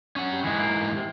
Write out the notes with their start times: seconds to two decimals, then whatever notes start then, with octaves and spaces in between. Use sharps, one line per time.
0.16 C#4 F#5
0.32 G3
0.44 G#2 E3 G#3
0.59 A#3
0.95 C3